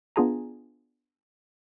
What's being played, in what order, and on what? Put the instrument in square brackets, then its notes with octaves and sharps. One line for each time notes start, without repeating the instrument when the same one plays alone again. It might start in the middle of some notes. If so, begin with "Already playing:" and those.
[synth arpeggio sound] B3 D4 F4 G#4 G#5 A#5